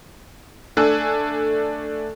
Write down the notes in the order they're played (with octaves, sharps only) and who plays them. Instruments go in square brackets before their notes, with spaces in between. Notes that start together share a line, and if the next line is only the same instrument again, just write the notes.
[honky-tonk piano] A3 D4 A4 G#5 E6 F#6